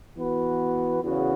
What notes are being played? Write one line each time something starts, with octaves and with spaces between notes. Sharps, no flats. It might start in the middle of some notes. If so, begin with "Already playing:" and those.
E3 B3 F#4 B4
E2 C#3 E3 B3 F#4